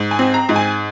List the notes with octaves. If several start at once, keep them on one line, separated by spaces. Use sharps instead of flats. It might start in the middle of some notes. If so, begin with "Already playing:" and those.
Already playing: G#2
G#5
C4
A#5
G#2
G#5